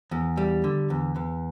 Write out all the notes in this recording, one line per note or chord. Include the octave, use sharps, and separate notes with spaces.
E2
G3
D3
E2
E2